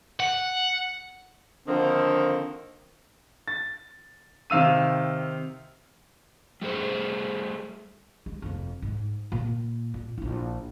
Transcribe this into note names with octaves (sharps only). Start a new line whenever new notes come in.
F#5
D3 D#3 F3 A#3 C4
A6
C3 D#3 F5 E6 D#7
G3 A3 G#4 C5
G#3
F1 F2
G#2
A#2 A#3
A#2
A#1 E4